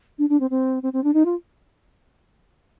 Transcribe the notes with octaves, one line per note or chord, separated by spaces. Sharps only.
D4
D4
C4
C4
C4
C4
D4
D#4
F4